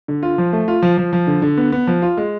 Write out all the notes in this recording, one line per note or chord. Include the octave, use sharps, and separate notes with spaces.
D3
F4
F3
A3
F4
F3
F3
F3
D3
D3
B3
B3
F3
F4
G#3